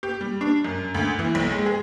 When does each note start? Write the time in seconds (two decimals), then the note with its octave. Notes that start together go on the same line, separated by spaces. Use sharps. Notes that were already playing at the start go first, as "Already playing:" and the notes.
0.03 G4
0.21 G3
0.41 D4
0.65 F#2
0.94 D2
1.19 E3
1.35 B1
1.52 G#3
1.66 G#4